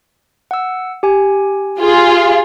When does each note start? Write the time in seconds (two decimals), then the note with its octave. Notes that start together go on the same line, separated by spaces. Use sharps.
0.51 F#5 E6
1.03 G4 G#5
1.79 F4 G#4